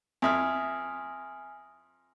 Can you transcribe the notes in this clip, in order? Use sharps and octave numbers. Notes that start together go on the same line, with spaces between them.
F2 E4 G#5 D#6 F6